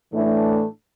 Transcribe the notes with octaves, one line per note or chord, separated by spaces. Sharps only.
A2 E3 A3 D4